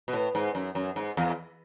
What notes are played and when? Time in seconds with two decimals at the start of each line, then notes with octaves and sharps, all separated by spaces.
0.08 B2
0.13 A2
0.35 G#2
0.55 F#2
0.75 F#2
0.96 G#2
1.17 E2